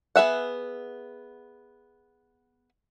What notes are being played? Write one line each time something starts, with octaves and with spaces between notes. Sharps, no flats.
B3 G#4 E5 F#5